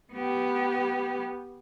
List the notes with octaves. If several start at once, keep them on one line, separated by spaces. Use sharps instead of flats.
B3 G4